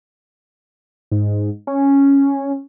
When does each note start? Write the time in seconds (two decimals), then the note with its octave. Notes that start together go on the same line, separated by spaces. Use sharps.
1.11 G#2
1.67 C#4